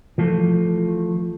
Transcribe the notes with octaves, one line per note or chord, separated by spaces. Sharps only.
E3 F3 A3